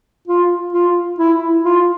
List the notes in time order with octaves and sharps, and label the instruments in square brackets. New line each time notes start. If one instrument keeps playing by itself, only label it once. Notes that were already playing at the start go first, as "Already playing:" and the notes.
[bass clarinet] F4
F4
E4
F4